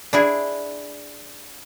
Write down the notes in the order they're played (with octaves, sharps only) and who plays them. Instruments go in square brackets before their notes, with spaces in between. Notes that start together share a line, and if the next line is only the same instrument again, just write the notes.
[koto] D4 E4 G#4